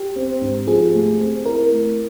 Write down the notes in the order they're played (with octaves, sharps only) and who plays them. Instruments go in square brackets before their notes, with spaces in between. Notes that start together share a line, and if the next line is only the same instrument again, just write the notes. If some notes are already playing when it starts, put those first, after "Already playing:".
Already playing: [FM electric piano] G4
[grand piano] C4
G#2
[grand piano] F3 [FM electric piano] G#4
[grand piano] A3
C4
[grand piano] E4 [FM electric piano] A#4
[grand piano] A3